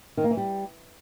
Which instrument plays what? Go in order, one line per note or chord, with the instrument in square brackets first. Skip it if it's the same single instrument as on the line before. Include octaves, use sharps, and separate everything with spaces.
[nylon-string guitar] D#3
A#3
E3
G3